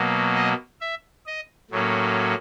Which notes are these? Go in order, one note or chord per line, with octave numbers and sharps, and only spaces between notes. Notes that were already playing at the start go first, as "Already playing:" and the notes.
Already playing: B2 F#3 A#3
D#5
E5
D#5
A2 F#3 A#3 C#4